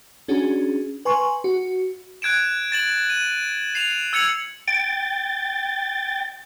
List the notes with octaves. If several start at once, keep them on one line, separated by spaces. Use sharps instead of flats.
C#4 D4 F#4 G#4
B4 G#5 C6 C#6
F#4
F#6 G#6 D7 E7
A6 E7 F#7
D#7
C7 E7 F7
E6 G#6 C#7 F7 F#7
G5 A6